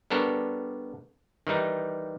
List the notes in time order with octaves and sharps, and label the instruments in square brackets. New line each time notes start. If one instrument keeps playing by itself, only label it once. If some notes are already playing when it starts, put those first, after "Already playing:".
[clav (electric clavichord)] G3 B3 D4 A4 A#4 C#5
D#3 E3 G3 D#4